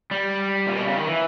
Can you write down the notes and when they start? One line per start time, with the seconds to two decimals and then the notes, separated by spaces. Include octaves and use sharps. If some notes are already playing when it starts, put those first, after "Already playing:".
0.11 G3
0.68 A#2
0.77 B2
0.87 C#3
0.97 D#3
1.07 E3